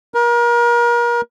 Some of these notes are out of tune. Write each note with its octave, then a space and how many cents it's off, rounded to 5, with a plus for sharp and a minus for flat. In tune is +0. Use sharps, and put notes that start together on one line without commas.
A#4 +35